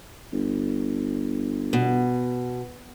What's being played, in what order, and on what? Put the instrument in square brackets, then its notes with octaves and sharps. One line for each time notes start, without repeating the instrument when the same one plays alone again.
[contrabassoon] G1
[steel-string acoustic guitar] B2